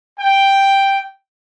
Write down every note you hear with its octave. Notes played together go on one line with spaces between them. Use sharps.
G5